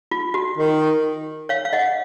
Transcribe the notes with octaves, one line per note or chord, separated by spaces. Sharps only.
F4
F#4
D#3
C#5 F5
F5
D#5 F#5